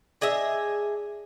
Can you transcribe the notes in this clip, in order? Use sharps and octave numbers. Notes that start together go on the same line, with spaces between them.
D4 G#4 D#5 E5